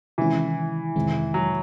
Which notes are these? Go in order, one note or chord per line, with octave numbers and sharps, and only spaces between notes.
C3 D#3 E3 G#3 C#4 E4
F2 C3 D#3 G#3 C4
F#3